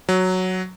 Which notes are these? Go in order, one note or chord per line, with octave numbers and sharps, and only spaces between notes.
F#3